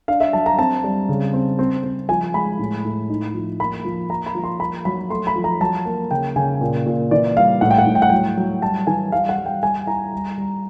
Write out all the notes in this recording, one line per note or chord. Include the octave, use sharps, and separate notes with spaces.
D4 F5
E5
F#3 A5
A#5
C4 A5
G3
C#3
C4
C4
C4
F3 G#5
G#3 B5
A2
A2
D#4
F3
A#3 B5
F3
A#3 A#5
B5
F3
C6
A#3 B5
F#3 B5
A3 C6
B5
F3
A#5
F#3 A5
A#3
C#3 G5
C#3 G#5
A#2
A#2
E3 D5
G3 F5
A2 F#5
G5
F#5
A2
G5
F#5
F#3 G5
F#3
G3 A5
E3 G#5
G3 F5
F#5
G3
G5
G3 G#5
E4 A#5
G3
G3